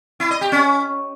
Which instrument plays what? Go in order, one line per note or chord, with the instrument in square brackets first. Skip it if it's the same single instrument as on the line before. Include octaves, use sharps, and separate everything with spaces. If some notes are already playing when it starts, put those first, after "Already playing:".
[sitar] E4
D#5
G4
C#4